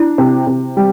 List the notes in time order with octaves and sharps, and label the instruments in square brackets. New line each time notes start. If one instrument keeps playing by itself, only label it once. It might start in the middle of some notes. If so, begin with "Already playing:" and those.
Already playing: [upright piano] D4 [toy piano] E4
[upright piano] C3
C3
G3